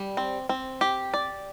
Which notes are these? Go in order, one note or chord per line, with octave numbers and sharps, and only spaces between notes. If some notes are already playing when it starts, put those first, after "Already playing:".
Already playing: G3
C4
C4
G4
D5